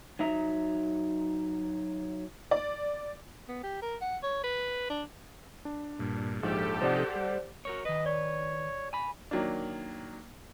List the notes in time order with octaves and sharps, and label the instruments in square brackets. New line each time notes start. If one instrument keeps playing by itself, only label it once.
[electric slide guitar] F#3 D#4 E5 A#5
[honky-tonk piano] D5
[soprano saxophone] B3
G4
A#4
F#5
C#5
B4
D4
[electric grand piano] D4
[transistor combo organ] G2 A#2
[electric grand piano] A#1 G#2 [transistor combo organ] F3 [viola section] G4 A4
[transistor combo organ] C3 F3 D#4 [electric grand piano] C5 D5 F#5
[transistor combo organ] G3
[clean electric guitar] F#4 A#4 C#5
[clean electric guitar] D#3 B4 [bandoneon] D#5
[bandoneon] C#5 [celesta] D5
[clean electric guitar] G#5 B5
[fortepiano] D#3 F#3 A#3 D4